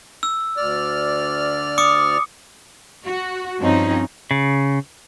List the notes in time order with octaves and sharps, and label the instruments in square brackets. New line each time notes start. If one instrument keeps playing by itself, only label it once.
[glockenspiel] E6
[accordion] D2 D5 F6
[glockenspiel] D6 D#6 C#7
[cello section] F#4
G2 F3 C4 C#4 D#4
[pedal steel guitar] C#3